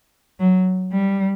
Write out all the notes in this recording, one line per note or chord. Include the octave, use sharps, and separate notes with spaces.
F#3
G3